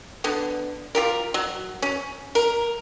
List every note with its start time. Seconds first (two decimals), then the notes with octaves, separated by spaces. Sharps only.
0.24 D3 B3
0.95 F4 G4 A#4
1.34 F#3
1.82 C#4
2.35 A#4